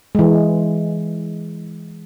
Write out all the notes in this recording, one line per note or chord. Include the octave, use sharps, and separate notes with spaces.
E3 G#3